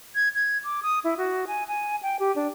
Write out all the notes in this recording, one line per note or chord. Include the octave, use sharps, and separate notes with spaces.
G#6
G#6
D6
D#6
E4
F#4
G#5
G#5
G5
G4
D4